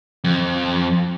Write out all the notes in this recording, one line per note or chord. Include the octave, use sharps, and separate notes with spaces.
F2